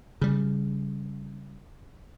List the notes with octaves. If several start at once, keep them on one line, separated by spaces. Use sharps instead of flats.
C#3 G3